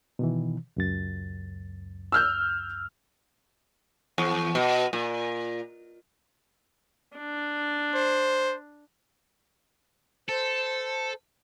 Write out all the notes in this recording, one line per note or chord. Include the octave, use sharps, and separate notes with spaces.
B2 D#3 E3
C#2 F#2 A6
E6 F6 G6
E2
B2
A#2
D4
C5
A4 C5